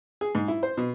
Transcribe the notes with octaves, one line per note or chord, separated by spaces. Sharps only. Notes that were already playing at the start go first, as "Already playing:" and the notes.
G#4
G#2
E4
C5
B2